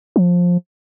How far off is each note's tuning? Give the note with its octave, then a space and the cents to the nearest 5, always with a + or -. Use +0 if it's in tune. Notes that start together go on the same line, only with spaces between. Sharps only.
F3 +15